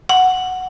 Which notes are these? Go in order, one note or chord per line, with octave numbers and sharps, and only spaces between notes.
F#5